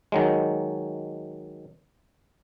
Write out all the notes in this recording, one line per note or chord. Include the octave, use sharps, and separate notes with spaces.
D#3 F#3 G#3